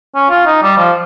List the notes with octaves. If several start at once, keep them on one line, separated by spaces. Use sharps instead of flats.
C#4
F4
D#4
G3
F3